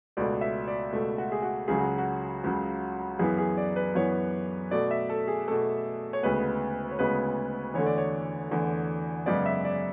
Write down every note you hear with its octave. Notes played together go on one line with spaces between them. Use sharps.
C#2 B2 A3 D5
E5
D5
C#2 B2 A3
F#4
G#4
F#4
C#2 C#3 F#3 G#4
F#4
F#4
C#2 C#3 F#3
F#2 E3 B3 G#4
G#4
D5
B4
F#2 E3 B3 C#5
B2 A3 D5
E5
A4
G#4
B2 A3 A4
C#5
D2 C#3 G#3 B3 B4
C#5
D2 C#3 G#3 B3 B4
E2 D3 A3 C#5
D5
C#5
E2 D3 A3
F#2 C#3 G#3 B3 D5
E5
D5